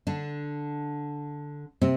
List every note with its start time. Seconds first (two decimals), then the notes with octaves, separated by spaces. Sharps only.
0.07 D3 D4
1.81 C3 C4